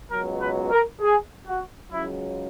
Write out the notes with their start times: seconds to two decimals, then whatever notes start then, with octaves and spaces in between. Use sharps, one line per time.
0.10 C#2 B2 F#3 A#4
0.41 B4
0.71 A#4
1.01 G#4
1.46 F#4
1.91 C#2 C#3 F#3 E4